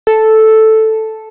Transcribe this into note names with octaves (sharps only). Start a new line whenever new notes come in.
A4